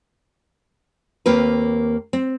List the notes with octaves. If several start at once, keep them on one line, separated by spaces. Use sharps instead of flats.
D#2 A#3 C4 B4
C4